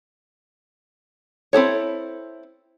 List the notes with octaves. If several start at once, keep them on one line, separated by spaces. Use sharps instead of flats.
C4 E4 A4 C#5